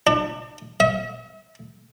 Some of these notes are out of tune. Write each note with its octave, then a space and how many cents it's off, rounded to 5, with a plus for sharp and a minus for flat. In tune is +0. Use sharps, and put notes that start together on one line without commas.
D4 +35
E5 -45